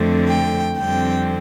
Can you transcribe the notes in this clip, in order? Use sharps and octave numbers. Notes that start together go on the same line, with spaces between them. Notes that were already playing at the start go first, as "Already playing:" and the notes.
Already playing: F2 D3 A3 C4
G5
F2 D3 G3 C4 G5